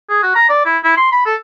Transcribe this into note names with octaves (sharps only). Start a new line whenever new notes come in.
G#4
F#4
A#5
D5
E4
E4
C6
B5
A4